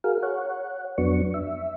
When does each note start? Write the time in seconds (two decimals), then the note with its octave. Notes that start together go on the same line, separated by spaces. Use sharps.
0.04 F#4 G#4 A#4 F5
0.23 C#5 F#5
0.98 F2 F#3 B3 D4 C#6
1.34 E5